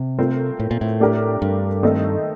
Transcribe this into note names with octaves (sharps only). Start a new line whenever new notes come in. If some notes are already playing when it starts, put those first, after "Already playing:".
Already playing: C3
A3 C4 F4 A#4
A2
A#2
A2
A3 D4 G4 A#4
G2
D#3 A3 C4 D#4 A4